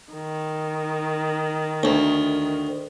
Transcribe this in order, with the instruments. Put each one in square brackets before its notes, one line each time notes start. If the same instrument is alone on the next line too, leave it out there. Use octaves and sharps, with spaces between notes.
[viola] D#3
[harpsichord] D2